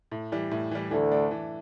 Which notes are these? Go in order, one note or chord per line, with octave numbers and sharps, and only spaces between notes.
A2
E3 G3
A2
E3 G3
D2 D3 E3
A3 D4
E3